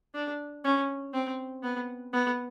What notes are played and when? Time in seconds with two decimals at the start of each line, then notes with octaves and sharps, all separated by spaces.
0.14 D4
0.64 C#4
1.14 C4
1.63 B3
2.13 B3